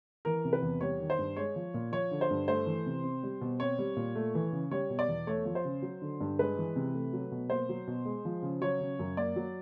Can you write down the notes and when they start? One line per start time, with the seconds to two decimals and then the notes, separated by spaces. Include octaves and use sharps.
0.25 E3 A#4
0.45 C3
0.53 B4
0.62 E2
0.81 G3 C#5
1.00 D#3
1.10 C5
1.19 G2
1.36 G#3 C#5
1.56 F3
1.74 A#2
1.92 F3 C#5
2.11 D3
2.21 C5
2.30 G2
2.48 A3 C5
2.66 E3
2.86 C3
3.04 C4
3.23 G3
3.41 B2
3.60 C4 C#5
3.79 G3
3.97 A#2
4.15 A3
4.35 E3
4.53 C#3
4.71 G3 C#5
4.90 B2
4.99 D5
5.08 E2
5.27 A3 C#5
5.45 F3
5.55 C5
5.65 C#3
5.82 F#3
6.02 D3
6.21 G2
6.39 G#3 B4
6.58 E3
6.76 C3
6.95 A3
7.13 F#3
7.31 B2
7.50 A#3 C5
7.69 F#3
7.87 B2
8.05 G#3
8.25 F3
8.43 C#3
8.61 F#3 C#5
8.81 C#3
8.99 F#2
9.17 A#3 D5
9.36 F#3